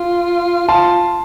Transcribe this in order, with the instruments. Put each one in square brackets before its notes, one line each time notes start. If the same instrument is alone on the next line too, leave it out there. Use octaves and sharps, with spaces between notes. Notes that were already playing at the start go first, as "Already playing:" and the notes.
Already playing: [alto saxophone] F4
[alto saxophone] F4 [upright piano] A5 C6